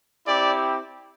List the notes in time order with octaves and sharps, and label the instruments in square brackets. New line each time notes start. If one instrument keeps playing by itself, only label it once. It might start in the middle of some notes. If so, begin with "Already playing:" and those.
[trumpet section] C4 E4 G4 D5